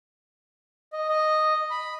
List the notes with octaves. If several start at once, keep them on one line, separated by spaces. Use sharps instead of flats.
D#5
D#5
B5